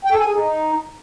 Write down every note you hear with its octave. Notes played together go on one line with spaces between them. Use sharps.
G5
A4
G#5
G#4
D#4